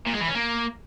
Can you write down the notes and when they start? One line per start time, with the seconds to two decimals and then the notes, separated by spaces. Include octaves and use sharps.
0.06 A#2
0.13 G#3
0.20 E3
0.28 C#4
0.35 A#3